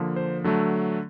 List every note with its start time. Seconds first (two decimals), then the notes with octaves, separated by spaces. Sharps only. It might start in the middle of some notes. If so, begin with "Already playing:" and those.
Already playing: D3 F3 A#3
0.16 C5
0.44 D3 F#3 A3